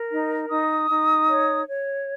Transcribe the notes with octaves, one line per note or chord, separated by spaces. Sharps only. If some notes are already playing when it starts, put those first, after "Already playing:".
Already playing: A#4
D#4
D#4 D#6
D#4
C#5
C#5